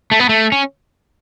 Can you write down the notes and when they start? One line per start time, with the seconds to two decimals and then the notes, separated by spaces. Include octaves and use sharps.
0.11 A3
0.20 B3
0.29 A3
0.52 C#4